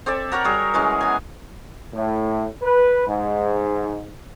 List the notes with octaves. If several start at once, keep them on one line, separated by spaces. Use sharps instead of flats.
C4 A4 D5 E5
A#4 C#5 F#5 A#5
G3 F#4 G#4
E3 G#3 C#4
B3 G#5
A2
B4
G#2